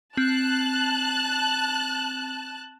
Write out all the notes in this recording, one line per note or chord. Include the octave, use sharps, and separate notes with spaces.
C4 A5 F#6